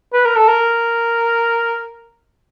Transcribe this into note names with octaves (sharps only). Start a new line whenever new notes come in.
B4
A#4
A4
A#4